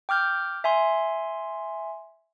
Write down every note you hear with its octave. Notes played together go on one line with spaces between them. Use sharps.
G5 D6 F6 G6
E5 G#5 C6